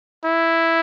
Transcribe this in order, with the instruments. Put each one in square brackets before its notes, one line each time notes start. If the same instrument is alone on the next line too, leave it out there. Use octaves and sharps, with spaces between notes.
[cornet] E4